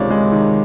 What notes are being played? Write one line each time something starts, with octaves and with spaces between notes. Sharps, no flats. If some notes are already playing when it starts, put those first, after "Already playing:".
Already playing: C#2 C3 D#3 G#3 C#5 D5
G#3
D#3